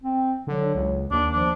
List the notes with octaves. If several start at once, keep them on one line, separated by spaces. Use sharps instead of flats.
C4
D3 F#3
C#2
D#2 D4
F3 D4